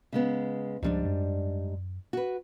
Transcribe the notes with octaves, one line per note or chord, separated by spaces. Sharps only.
C#3 G#3 B3
C#2 G#2 F3 G3 D4
F#2
F#4 B4